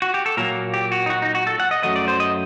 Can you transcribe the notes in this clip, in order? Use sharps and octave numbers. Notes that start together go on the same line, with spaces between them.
F#4
G4
A4
A#2 F#3 A#3 A#4
G4
F#4
D#4
F#4
D#4
F#4
A4
F#5
D#5
F#2 F#3 A3 D#5
D5
C5
D#5